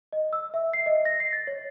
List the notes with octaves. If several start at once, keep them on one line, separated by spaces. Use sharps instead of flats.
D#5
E6
E5
C7
D#5
A#6
C7
A6
C#5